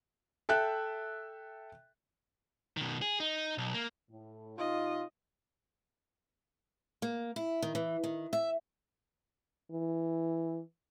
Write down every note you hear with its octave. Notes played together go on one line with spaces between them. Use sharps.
A4 E5 G5 F#6
B2 D#3
G#4
D#4
B1
A#3
A2
C3 C4 D#4 F4 D#5
A#3
E4
D#3
E3
D#3
E5
E3